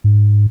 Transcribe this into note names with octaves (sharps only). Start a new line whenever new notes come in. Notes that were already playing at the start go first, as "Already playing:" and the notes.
G#2